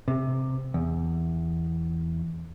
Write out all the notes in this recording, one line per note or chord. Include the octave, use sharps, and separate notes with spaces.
C3
E2